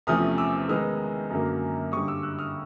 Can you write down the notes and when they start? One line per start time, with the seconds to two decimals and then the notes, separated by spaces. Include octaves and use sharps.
0.07 E2 C3 F3 A3 C#4 D#6 F6
0.38 D6 E6
0.69 D#3 G#3 B3 D#4 D#6 F6
1.30 F#2 D3 F#3 A#3
1.92 G2 D3 G3 C#6 D#6
2.07 D6 E6
2.23 E6 F#6
2.39 D#6 F6